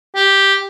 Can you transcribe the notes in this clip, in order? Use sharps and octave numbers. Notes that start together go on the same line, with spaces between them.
G4